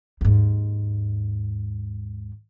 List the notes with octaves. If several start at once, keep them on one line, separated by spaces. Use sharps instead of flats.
D#2 G#2